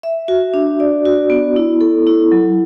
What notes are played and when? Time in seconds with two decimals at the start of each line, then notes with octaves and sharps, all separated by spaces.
0.03 E5
0.28 F#4
0.54 D4
0.80 D5
1.06 F#4
1.30 B3
1.56 E4
1.81 A4
2.07 E4
2.32 F#3